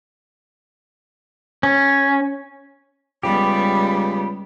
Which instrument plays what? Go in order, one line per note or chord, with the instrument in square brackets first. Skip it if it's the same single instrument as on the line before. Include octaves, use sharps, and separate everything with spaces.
[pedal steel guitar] C#4
[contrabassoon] C#2 [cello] G3 B3 [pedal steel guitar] G4 [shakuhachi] B5